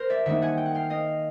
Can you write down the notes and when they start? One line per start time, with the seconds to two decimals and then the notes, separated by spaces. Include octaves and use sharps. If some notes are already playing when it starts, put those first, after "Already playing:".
Already playing: A#4 C5
0.10 D5 E5
0.25 D#3 G3 A#3 D#4 E5 F#5
0.42 F#5 G#5
0.57 G5
0.66 F#5
0.75 F5 G5
0.90 D#5 F5